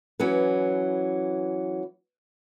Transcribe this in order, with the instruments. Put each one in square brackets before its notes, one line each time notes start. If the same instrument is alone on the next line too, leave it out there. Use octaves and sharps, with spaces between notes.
[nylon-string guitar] E3 F#3 C#4 B4